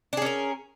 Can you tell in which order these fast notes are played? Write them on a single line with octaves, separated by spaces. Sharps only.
D4 G#4 C#4 A#4